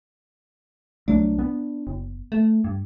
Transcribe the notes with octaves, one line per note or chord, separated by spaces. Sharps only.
C2 F#3 A3 D4
B3
F#1
A3
G2